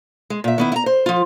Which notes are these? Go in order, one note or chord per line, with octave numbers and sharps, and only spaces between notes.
G#3
A#2 E5
D#3 B3 E4
E4 A#5
C5
F3 F4